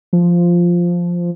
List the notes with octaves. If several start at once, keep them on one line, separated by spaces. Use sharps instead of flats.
F3